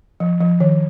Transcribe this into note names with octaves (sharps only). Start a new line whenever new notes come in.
F3
F3
D#3